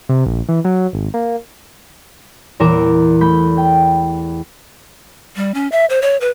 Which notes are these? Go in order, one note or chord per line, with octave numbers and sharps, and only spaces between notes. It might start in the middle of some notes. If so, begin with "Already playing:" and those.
C3
A#1
E3
F#3
G#1
A#3
E2 A#2 A#4 D6 E7
A3 B5 G6
G5
G3
C#4
E5
C5
C#5
B4